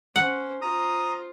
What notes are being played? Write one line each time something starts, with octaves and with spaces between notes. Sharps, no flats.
C#4 C5 F#5
F4 C5 A#5 D#6